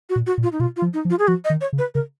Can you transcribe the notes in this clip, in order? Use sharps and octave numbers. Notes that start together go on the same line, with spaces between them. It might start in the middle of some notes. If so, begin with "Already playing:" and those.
F#4
A#2
F#4
A#2
F4
D#4
B2 F4
F4
F3
D#4
F3
F4
G#4
F3 F#4
D#5
D#3
C#5
C#3
B4
C#3 A#4